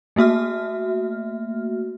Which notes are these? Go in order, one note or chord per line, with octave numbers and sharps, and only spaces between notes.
A3 A#3 F#4 E5 F6